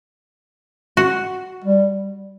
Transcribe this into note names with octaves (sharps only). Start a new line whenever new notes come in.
F#4
G3